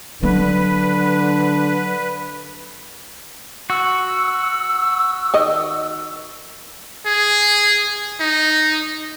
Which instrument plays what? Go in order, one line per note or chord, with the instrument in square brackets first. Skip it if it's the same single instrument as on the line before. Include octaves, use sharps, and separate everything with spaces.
[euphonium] D3 [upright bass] F#3 D4 [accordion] B4
[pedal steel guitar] F#4 [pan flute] E6
[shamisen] D#3 D#5
[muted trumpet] G#4
D#4